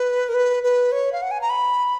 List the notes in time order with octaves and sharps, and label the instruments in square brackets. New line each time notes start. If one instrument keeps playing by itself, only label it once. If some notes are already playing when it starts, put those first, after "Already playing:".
Already playing: [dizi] B4
A#4
B4
B4
C#5
F5
F#5
G#5
A#5
B5